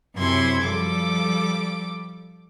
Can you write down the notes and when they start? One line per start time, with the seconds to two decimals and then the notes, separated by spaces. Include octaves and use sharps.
0.16 F#2 C3 C4 E4 C6 G#6
0.63 F3 G3 A4 D6